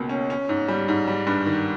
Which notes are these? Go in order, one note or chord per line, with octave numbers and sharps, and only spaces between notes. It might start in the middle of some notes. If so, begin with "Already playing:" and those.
Already playing: C#2 B2 A#3
C#4
C#4
G#2
G3
G#2
G3
G2
D#3